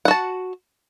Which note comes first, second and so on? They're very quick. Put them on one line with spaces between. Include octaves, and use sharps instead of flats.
F#5 F#4 A5